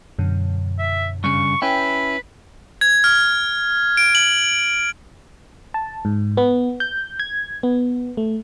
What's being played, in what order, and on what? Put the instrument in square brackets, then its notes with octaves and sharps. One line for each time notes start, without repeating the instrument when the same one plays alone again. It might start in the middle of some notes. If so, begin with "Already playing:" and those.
[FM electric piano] F#2 B2 D3
[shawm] E5
[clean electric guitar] G2 C#3 [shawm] C#6
[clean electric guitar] C#4 E4 [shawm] B4 [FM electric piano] G5
[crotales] G#6
F6
D7
F#7
[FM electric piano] A5
G#2
B3
G6
G#6
B3
A3